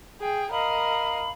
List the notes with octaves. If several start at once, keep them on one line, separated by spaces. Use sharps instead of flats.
G#4 G5
A#4 D#5 F5 B5